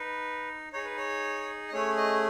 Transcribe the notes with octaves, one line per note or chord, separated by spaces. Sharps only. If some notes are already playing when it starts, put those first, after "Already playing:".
Already playing: D#4 B4
D#4 G#4 C#5
B4
C#5
D#5
A3 C#4 G#4 C#5
D#5